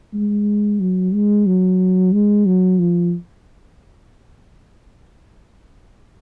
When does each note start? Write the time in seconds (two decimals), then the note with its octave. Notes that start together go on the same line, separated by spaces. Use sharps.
0.14 G#3
0.80 F#3
1.14 G#3
1.46 F#3
2.13 G#3
2.46 F#3
2.79 F3